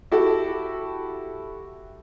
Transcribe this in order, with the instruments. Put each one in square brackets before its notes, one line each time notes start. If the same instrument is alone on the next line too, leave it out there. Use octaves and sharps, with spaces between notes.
[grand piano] E4 F#4 G4 A4